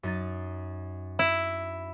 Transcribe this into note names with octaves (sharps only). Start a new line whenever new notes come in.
F#2 D#4 A6
E4